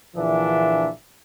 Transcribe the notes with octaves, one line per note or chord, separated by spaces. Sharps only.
A#1 A#2 D3 E3 D4 E5